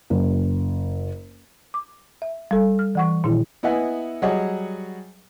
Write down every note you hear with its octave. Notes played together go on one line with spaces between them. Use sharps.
F#1
D6
E5
G3 A4
F6
E3 F#5 C#6
A#2 D#3 E4
B3 E4 D#5 E5 F#5 G#5
F#3 G3 G#4 C#5 D#5 F#5